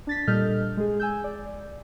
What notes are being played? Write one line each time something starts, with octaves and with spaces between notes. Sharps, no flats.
D4 A6 B6
A#2 G3 A4 D#5 F6 G6
G#3 G#4
G#5 E6 G6
D5